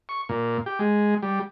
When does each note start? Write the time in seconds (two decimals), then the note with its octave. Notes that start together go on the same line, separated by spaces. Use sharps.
0.09 C#6
0.29 A#2
0.66 G4
0.79 G#3
1.22 G3